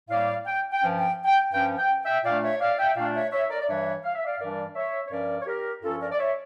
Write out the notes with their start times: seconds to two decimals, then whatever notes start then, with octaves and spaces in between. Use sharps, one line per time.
0.10 A2 G3 A#3 D5 F5
0.46 G5
0.72 G5
0.81 G2 F3 C#4
0.99 G5
1.25 G5
1.52 G2 F3 C#4 G5
1.78 G5
2.04 E5 G5
2.24 A#2 A3 D4 D5 F5
2.43 C#5 E5
2.60 D5 F5
2.78 E5 G5
2.96 A#2 A3 D4 D5 F5
3.14 C#5 E5
3.32 C#5 E5
3.50 A#4 D5
3.61 D5
3.68 G2 E3 G3 D4 C#5 E5
4.04 F5
4.15 E5
4.25 D5 F5
4.39 G2 E3 G3 D4 A#4 D5
4.75 C#5 E5
5.07 C#5
5.11 G2 F3 C#4 A#4 D5
5.41 C#5
5.47 G4 A#4
5.82 G2 F3 C#4 F4 A4
6.01 A#4 D5
6.12 D5
6.18 C#5 E5